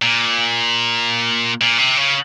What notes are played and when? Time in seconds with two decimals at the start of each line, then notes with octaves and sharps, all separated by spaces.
0.02 A#2
1.61 A#2
1.78 C3
1.97 C#3